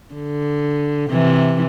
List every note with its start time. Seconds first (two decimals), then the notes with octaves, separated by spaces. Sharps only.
0.14 D3
1.10 C3 E3